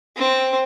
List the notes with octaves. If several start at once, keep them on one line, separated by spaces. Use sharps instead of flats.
C4